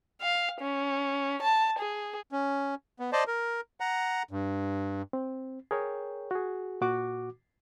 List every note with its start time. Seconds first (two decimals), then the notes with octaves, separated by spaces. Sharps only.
0.21 F5
0.61 C#4
1.42 A5
1.79 G#4
2.32 C#4
3.00 B3
3.13 C5 D5 D#5 A5
3.28 A#4
3.80 F#5 A#5
4.31 G2
5.13 C4
5.71 G#4 A#4 C#5 G5
6.31 F#4 G#4
6.81 A#2 F#4 D6